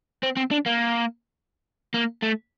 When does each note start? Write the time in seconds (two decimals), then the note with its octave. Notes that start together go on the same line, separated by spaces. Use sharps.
0.23 C4
0.37 C4
0.51 D4
0.66 A#3
1.94 A#3
2.23 A3